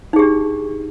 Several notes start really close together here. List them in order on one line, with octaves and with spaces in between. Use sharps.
D#4 G#4 G4 D4